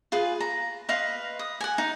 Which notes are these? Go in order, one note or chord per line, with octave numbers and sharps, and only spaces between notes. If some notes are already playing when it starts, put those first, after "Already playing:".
F4 G#4 B4
A#5
B4 D#5 F5 C6
D#6
F#5 G#5
D#4